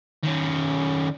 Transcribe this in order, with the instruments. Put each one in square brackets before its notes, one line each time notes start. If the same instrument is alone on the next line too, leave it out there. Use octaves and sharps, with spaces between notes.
[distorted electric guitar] D#3 C#4